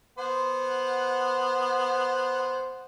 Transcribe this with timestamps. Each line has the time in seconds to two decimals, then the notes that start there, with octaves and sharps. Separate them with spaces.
0.18 B3 C5 F#5